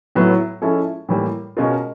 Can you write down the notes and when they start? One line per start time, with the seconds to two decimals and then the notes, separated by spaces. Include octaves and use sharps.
0.15 A2 F#3 B3 E4
0.62 F3 G#3 C#4 E4 A4
1.09 A2 E3 G3 A#3
1.57 B2 G#3 C#4 F4 A#4